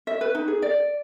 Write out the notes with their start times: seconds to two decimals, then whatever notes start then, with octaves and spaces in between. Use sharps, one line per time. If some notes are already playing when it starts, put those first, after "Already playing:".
0.07 E5
0.21 B4
0.35 D#4
0.48 G#4
0.62 D5